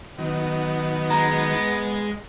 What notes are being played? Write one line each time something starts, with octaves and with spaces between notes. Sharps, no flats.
D#3 F#3 B3
G#3 A#5